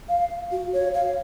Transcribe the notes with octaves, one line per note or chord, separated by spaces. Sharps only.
F5
F#4
C#5
F5